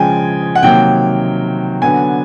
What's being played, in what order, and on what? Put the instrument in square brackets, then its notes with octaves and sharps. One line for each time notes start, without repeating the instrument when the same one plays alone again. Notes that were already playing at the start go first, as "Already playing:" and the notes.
Already playing: [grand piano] C#3 F3 G#3 G5 G#5
F#5
C3 D#3 F#3 A#3 G5
D3 F#3 B3 G#5